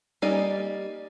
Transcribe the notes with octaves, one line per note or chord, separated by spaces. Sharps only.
G3 A#3 D#4 D5 G#5